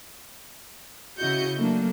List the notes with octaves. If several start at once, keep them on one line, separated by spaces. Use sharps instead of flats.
C#3 E4 F#4 D#5 G6 C#7
F#3 A3 A#3 D4